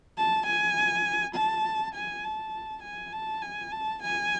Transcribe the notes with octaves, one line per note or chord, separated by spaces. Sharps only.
A5
G#5
A5
G#5
A5
G#5
A5
G#5
A5
G#5